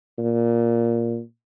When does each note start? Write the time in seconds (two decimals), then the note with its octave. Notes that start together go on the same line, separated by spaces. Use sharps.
0.19 A#2